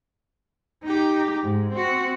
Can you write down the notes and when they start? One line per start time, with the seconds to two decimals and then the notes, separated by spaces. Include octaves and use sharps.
0.83 D#4 G4
1.43 G#2
1.72 C4 F#4